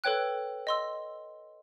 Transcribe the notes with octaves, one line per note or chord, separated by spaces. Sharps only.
A4 B4 C#5 G5 F#6
D#5 C6 E6